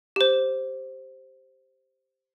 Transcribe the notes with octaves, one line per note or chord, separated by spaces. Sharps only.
G4 C5